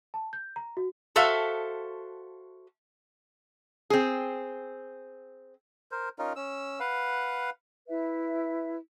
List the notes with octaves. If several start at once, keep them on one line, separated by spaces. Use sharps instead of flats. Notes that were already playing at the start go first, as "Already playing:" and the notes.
A5
G6
A#5
F#4
F#4 A4 C5 E5 F5
C4 G#4
A#4 C5
C#4 D#4 F4 A#4
C#4 E6
B4 F5 F#5
E4 B4 E5